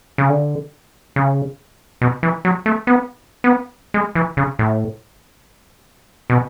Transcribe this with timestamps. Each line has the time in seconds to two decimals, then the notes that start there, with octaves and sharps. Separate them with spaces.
0.18 C#3
0.30 D3
1.16 C#3
2.02 B2
2.23 E3
2.45 F#3
2.66 A3
2.87 B3
3.44 B3
3.94 G#3
4.15 E3
4.37 C#3
4.59 A2
6.30 B2